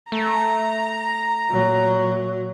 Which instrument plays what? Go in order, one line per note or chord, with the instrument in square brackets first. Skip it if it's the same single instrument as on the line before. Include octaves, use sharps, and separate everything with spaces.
[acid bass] A3 [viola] A#5
[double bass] A#2 F#3